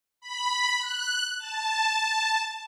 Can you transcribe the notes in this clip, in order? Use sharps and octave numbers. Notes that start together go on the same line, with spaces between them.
B5
F#6
A5